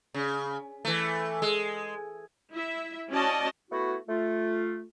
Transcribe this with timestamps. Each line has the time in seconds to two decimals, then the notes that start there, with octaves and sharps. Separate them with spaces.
0.14 C#3
0.85 E3 A3
1.42 G#3
2.52 E4 E5
3.11 C#4 F#4 D5 D#5 A5
3.71 A3 B3 E4 F#4
4.07 A3 F4